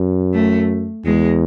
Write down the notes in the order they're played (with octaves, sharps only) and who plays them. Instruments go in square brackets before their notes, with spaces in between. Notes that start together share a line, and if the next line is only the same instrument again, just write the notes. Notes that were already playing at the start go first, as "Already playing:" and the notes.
Already playing: [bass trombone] F#2
[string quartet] A3
[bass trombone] E2 [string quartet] G#3